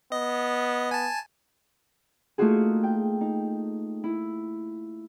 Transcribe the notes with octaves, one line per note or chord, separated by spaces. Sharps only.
B3 D#5
G#5 A5
A3 A#3 D#4 F4 F#4 G#4
G5
D#4
E4